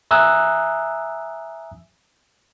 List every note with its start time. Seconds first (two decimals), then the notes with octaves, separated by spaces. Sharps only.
0.11 E5 G#5 A#5 D#6 E6 F#6